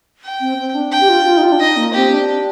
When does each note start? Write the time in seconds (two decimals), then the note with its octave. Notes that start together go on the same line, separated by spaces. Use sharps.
0.25 G5
0.41 C4
0.58 C4
0.74 D4
0.92 G5
1.00 G4
1.09 F4
1.26 F4
1.37 D#4
1.43 F4
1.52 D4
1.60 D#4 D#5
1.77 A#3
1.94 C4 G4
2.11 D4